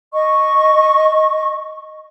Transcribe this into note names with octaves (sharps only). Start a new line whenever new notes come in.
D#5 C#6